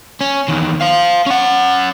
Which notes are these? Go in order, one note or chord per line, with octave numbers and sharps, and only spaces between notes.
C#4
E2 D#3
C5 F5
C#4 F#5